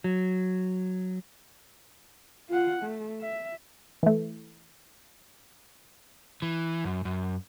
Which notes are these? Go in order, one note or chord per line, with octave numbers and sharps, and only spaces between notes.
F#3
F4 F#5
A3
E5
E3 A3
E3
F#2
F#2